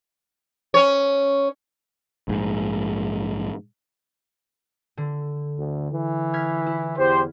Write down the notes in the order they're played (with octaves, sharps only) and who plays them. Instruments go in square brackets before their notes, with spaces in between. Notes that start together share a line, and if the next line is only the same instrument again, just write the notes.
[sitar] C#4 C#5
[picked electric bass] A#1 G#2
[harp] D3
[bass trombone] D2
E3
[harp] F6 G#6 B6
E4
[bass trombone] E2 [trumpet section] G4 C5